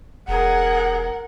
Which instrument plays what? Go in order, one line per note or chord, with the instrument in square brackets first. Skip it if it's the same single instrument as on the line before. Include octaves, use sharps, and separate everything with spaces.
[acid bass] E1 [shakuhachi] G#4 [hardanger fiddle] A#4 [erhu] F#5